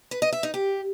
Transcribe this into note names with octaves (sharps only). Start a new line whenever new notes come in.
B4
D#5
E5
D#4
G4